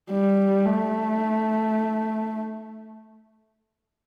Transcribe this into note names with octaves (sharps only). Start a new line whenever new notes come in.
G3
A3